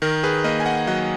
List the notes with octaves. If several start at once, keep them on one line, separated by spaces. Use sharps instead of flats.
D#3 A#4
G#4 B4
A#3 B4 D#5
G#5
D#5 F#5
F#3 D#5 F#5